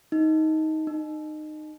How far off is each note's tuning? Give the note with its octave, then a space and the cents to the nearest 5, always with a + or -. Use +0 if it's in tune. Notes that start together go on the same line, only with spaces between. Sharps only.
D#4 +15
D#4 -25